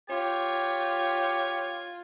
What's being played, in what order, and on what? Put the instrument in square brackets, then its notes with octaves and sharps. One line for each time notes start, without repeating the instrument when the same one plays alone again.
[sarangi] F4 [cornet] G4 [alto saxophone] C#5 [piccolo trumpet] G#6